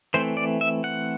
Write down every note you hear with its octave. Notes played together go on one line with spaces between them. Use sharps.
E3 A3 C4 C5
D5
E5
F#5